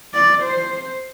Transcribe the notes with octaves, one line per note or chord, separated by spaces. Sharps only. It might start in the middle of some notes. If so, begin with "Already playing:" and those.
D5
C5